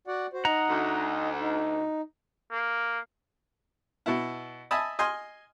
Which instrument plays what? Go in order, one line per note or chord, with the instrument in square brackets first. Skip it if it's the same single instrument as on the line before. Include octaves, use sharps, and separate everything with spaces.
[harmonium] F#4 D5 F#5
F#4 C5
[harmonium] D#4 D#5 [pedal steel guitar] F#5 A#5
[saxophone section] D2
[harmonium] D#4
[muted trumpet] A#3
[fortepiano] B2 E4
D#5 E5 G#5 A5 B5 D#6
D#5 G#5 C6 F6